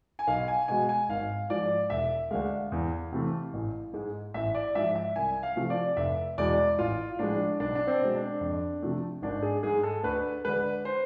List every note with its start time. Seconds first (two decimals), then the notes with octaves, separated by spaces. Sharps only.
0.19 G#5
0.27 B1 F5
0.48 G#5
0.68 B2 G#3 G#5
0.89 G#5
1.09 G#1 F5
1.50 G#2 F3 D5
1.90 E1 E5
2.31 D2 D3 G#3 F5
2.72 E2
3.12 C3 E3 A3
3.53 A1
3.93 G#2 G#3
4.34 A1 E5
4.55 D5
4.75 G#2 F3 E5
4.95 E5
5.16 C2 G#5
5.43 F5
5.56 C3 F3 A3
5.70 D5
5.97 F1 E5
6.38 E2 B2 G#3 D5
6.79 A1 F4
7.19 A2 F3 G#3 D4
7.60 B1 D4
7.75 D4
7.87 C4
8.01 B2 G#3
8.15 D4
8.41 F2
8.82 C3 F3 A3
9.22 G#1 D4
9.42 G#4
9.63 G#2 G#3 G#4
9.83 A4
10.03 D2 B4
10.45 D3 G#3 B4
10.85 C5